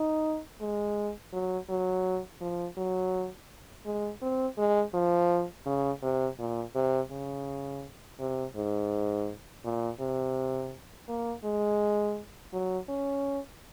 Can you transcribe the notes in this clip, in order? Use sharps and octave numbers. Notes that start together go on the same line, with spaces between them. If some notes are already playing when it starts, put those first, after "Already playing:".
Already playing: D#4
G#3
F#3
F#3
F3
F#3
G#3
C4
G#3
F3
C#3
C3
A#2
C3
C#3
C3
G#2
A#2
C3
A#3
G#3
F#3
C#4